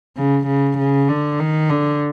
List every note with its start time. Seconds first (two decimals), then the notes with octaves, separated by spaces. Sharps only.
0.17 C#3
0.47 C#3
0.78 C#3
1.09 D3
1.39 D#3
1.70 D3